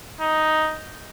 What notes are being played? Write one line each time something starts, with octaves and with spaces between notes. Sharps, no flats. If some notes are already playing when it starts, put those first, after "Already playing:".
D#4